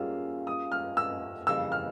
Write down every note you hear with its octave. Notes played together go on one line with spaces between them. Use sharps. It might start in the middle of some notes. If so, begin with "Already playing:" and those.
Already playing: G3 A#3 C#4 F4 G#4 E6
D#6
F6
E6
F2 C#3 E3 G3 A#3 E6
F6